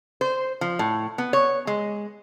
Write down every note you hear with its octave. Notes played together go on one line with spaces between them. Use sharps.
C5
F3
A2
B3
C#5
G#3